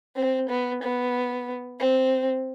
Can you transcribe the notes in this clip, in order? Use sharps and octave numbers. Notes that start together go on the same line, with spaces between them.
C4
B3
B3
C4